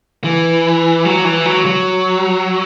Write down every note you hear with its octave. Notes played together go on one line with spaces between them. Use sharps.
E3
F#3
E3
F#3
F#3